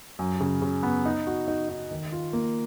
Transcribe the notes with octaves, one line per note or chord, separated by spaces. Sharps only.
F#2
C#3
C#3
B3
D#4
F#4
D#4
D#4
D#3
F4
A#3